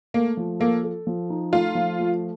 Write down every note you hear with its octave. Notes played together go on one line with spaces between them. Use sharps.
A3 A#3
F3
A#3 A4
A4
F3
D#4
A3 F4
F3
A3